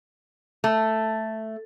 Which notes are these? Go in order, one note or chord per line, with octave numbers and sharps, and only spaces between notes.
A3